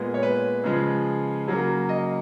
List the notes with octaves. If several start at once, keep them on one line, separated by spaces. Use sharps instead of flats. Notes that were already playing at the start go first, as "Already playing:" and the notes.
Already playing: A#2 G#3 B3
C#5
B4
C#3 F3 G#3
C#3 F#3 A#3
D#5